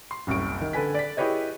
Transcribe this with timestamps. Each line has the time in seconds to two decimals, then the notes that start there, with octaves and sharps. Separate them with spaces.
0.11 C6
0.27 F#1 C2 C#4 C#6 D7
0.61 D#3
0.73 D3 A4 B4 G#5 B6
0.95 D5 B6
1.17 E4 G4 G#4 B4 C#5 D#5